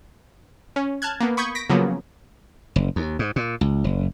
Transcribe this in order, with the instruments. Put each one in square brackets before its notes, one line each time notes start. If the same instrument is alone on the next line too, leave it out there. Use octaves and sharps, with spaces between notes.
[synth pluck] C#4
A5 F6 F#6 G#6
A#3 B3
B5 C#6 D#6 G6 G#6
A#6 B6 D7
C#3 F3 F#3 A#3 B3
[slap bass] F#1
D#2
G#2
A#2
C#2
F#1